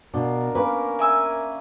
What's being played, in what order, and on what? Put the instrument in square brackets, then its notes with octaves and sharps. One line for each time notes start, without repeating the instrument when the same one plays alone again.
[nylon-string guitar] B2 [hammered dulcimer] D4 F5 [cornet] A#4
[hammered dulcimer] A#3 C#4 [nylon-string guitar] B4
[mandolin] E5 G#5 E6